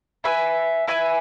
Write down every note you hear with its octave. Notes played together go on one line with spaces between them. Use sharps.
E4 B4 E5 G#5
E4 B4 E5 G#5